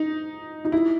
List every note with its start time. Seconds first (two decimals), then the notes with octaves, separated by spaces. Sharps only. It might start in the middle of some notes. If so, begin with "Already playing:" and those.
Already playing: D#4
0.65 D#4
0.72 E4